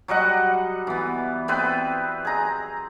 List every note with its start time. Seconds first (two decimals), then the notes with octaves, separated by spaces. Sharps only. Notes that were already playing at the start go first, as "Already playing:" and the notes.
0.08 F#3 G3 D#5 F#5
0.87 E3 B3
1.48 B3 C4 B4 G5
2.25 G#4 A#5